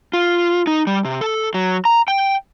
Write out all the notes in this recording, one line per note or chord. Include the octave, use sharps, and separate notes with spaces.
F4
D#4
G3
C3
A4
F#3
A#5
G5